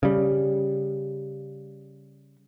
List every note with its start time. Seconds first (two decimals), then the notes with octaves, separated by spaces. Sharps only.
0.03 C#3 G3